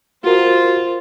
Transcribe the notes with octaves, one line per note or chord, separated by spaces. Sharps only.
F4 F#4 A#4 C5